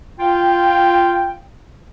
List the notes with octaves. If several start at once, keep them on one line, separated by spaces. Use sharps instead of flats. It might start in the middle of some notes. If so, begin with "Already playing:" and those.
F4 G5